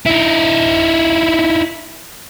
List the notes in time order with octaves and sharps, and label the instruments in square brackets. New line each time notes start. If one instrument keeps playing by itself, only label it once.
[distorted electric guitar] D#4 E4